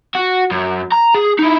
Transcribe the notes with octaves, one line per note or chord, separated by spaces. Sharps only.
F#4
F#2
A#5
G#4
D#4 E4